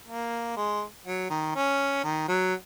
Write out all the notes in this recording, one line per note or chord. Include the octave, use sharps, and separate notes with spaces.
A#3
G#3
F#3
D#3
C#4
D#3
F#3